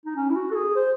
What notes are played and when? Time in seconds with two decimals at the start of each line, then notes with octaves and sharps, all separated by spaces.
0.05 D#4
0.16 C#4
0.30 E4
0.35 F#4
0.51 A4
0.56 G#4
0.76 C5